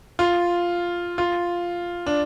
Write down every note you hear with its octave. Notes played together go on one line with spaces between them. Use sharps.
F4
F4
D4